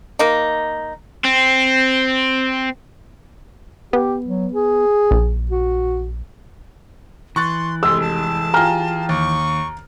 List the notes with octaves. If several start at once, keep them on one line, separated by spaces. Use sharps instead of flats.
A#3 D#4
C4
B3 G4
F#3
G#4
A#1
F#4
E3 C6 C#6 F#6 A6
F1 G#3 C6 E6
A5
F4 G4 G#4 A#5 F6
D#2 C#6